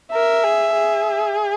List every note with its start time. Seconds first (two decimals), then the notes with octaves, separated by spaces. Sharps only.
0.13 A#4 E5
0.43 G#4
0.74 G#4